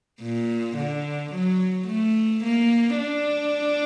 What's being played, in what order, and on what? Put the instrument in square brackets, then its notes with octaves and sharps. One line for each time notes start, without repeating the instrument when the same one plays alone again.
[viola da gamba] A#2
D3
F#3
A3
A#3
D4